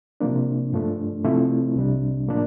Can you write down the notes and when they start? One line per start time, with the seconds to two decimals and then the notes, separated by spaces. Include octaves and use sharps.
0.20 C3 F3 A#3 D4
0.73 G2 F3 A3 D4
1.24 C3 F3 A3 C4 E4
1.76 C2 C3 G3 D4
2.28 A2 F3 A#3 D4